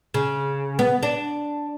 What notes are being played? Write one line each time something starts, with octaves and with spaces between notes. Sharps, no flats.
C#3
B3
D4